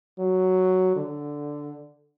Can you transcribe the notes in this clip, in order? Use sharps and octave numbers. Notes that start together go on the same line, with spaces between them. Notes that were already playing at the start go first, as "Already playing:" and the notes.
F#3
D3